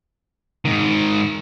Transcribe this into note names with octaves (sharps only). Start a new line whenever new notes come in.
G#2 D#3